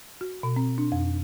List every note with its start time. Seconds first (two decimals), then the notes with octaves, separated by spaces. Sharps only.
0.21 F#4
0.43 B2
0.56 C4
0.78 D4
0.92 F2